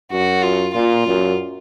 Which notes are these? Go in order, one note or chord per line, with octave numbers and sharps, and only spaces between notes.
F#2 F#4
F4
A#2 F4
F#2